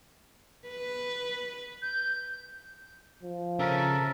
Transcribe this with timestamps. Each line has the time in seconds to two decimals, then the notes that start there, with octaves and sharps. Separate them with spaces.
0.68 B4
1.82 G6
3.23 F3
3.59 C#3 C#4 A4 A#4 E5